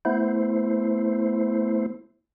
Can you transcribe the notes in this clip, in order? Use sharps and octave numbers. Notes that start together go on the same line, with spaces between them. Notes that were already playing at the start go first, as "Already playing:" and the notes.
A3 B3 E4 C5